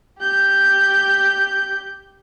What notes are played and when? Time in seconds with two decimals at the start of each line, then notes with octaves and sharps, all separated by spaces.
0.20 G4 G6